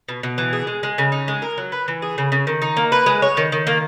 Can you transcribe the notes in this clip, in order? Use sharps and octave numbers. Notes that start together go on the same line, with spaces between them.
B2
B2
E3
G#4
G#3
G#3
C#3
D#4
G#3
A#4
F#3
B4
E3
G#4
C#3
C#3
D#3
D#4
A#3
B4
G#3
C#5
D#3
D#3
A#3